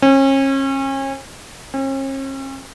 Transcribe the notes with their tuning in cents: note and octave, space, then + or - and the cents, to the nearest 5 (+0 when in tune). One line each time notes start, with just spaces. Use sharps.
C#4 -35
C#4 -45